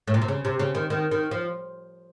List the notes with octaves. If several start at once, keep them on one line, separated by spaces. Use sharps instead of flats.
A2
A#2
C3
C#3
C3
C#3
D#3
D#3
D#3
F3